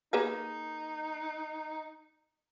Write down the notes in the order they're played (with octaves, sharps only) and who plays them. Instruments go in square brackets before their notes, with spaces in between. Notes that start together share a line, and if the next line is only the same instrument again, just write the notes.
[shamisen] A#3 G#4 B4 [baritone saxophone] D#4